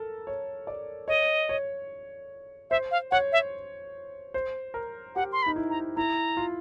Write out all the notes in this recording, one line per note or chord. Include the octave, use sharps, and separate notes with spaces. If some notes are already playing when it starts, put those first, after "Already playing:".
Already playing: A4 A#4
C#5
D5
C#5 D#5
C#5
C5 E5
F5
C#5 F#5
E5
C5
A#4
G4 F#5
C6
B5
D#4
E4
A#5
E4 A#5
F4